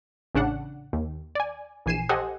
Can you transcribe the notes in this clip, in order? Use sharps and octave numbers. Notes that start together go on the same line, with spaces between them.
A1 C#3 D4 F#5
D#2
D5 G#5
A#1 E3 G#5 C7 D#7 E7
G4 A4 C5 D#5 F#5 G#5